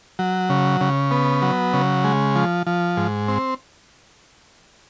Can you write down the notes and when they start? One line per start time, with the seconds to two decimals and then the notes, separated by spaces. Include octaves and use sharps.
0.19 F#3
0.50 C#3
0.81 C#3
1.11 B3
1.42 F#3
1.73 C#3
2.04 G#3
2.35 F3
2.67 F3
2.97 G#2
3.28 C4